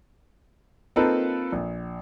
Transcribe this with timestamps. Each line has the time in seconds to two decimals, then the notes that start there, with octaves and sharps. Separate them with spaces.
0.96 A#3 C4 D#4 F4 A4 B4
1.52 A#1